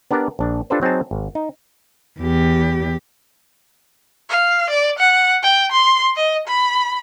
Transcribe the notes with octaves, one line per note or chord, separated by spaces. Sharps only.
B3 D4 G4 A#4 D5
A#1 D4
D4 F4 G4 A4 B4 C5
F#3 C4 D#4 G#4 A5
G#1
D#4
E2 G4
F5
D5
F#5
G5
C6
D#5
B5